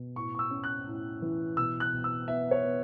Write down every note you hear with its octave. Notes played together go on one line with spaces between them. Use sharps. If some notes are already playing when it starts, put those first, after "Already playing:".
Already playing: B2
A2 C#6
C#6
E6
C#4
F#6
A2
E3
B2 E6
F#6
B2
E6
B3 E5
C#5
B3